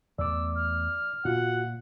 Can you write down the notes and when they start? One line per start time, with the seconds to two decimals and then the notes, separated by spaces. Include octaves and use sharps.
0.18 E2 A3 D5 D6 E6
0.55 F6
1.25 A#2 F4 F#4 F#5